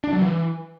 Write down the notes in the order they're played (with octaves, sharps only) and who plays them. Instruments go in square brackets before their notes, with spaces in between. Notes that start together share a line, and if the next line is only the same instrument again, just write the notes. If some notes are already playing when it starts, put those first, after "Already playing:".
[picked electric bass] D4
F#3
E3